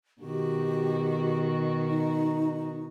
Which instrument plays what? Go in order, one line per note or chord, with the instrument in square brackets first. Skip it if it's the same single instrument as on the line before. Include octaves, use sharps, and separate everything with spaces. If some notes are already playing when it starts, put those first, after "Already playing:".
[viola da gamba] B2 D#3 F#4 [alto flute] G4
[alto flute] D#4